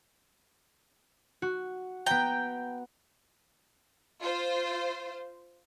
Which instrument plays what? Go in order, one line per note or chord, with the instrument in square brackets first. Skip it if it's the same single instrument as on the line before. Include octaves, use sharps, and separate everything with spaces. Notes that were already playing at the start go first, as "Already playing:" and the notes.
[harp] F#4
[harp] B3 A#5 [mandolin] G5
[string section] F4 C5